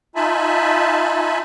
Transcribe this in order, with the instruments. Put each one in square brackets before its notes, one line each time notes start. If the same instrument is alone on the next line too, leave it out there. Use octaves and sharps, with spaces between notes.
[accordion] D#4 F4 E5 G#5 A5 B5